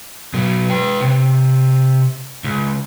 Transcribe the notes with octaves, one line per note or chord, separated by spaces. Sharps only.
B2 F#3
B4 G5
C3
C#2